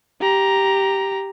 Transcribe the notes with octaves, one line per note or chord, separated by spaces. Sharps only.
G4 A#5